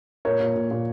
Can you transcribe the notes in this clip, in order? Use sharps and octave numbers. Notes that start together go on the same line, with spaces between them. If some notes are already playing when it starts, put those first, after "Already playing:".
A#2 A#4 C#5
A#2
A#2
A#2